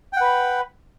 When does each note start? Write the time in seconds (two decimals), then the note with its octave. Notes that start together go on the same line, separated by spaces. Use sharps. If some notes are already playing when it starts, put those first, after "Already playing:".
0.13 G5
0.17 F#5
0.21 B4
0.25 B5